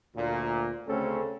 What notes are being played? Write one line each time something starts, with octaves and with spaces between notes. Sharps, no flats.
D2 A#2
D2 C#3 A3 C4 C#4 A4